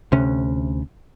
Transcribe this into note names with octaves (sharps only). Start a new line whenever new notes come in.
D2 C3 C#4